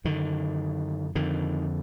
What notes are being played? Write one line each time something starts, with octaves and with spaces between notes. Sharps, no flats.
F#2 D3 D#3
F2 D3 D#3